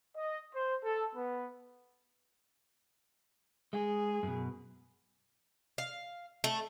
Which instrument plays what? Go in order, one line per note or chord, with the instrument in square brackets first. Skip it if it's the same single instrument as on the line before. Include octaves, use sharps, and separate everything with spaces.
[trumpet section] D#5
C5
A4
B3
[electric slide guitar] G#3 [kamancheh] G#4
[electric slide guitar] F#2 B2
[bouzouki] F5
A3